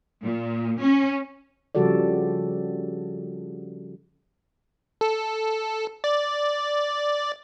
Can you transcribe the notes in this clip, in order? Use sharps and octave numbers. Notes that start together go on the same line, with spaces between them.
A#2
C#4
C#3 F3 G3 F#4 A4 D5
A4
D5